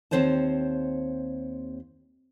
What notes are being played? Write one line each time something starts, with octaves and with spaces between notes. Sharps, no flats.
D#2 A#3 C4 C5 C#5 A5